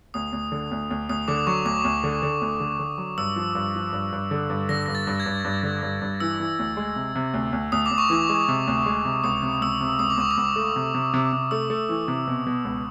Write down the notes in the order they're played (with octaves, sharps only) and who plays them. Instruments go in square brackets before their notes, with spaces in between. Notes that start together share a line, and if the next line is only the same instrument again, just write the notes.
[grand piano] D2 [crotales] D#6
[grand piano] D2
D3
D2
D2
[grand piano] D2 [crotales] D#6
[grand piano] D3 [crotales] D6
[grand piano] F#3 [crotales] C#6
[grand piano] D2 [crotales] D6
[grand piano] D2
D3
D3
D2
D3
D3
F#3
[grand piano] G2 [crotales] E6
[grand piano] F3
G2
F3
G2
G2
D3
G2
[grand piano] D3 [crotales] A#6
[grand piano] G2 [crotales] A#6
[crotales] A6
[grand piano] G2
[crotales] G#6
[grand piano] G2
G2
D3
G2
G2
[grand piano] E3 [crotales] E6
[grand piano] E3
D2
G#3
C3
C3
D2
D2
[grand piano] D2 [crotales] D#6
[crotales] D6
[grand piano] D2
[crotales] C#6
[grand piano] E3 [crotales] D6
[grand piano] G#3
C3
D2
G#3
C3
[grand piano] C#2 [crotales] D#6
[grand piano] C3
[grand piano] C#2 [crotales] E6
[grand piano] C3
[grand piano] C#2 [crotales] D#6
[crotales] D6
[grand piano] C#2 [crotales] C#6
[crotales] D6
[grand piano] C#2
A3
C3
C3
C3
C3
[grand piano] A3 [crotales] E6
[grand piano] A3
E3
C3
B2
B2
C#2